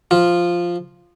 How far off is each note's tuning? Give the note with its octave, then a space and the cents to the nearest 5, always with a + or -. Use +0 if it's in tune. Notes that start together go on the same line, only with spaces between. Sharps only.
F3 +0 F4 +0